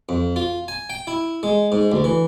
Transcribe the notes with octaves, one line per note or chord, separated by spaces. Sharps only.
F2
F4
G#5
G5
E4
G#3
G#2
D2
E3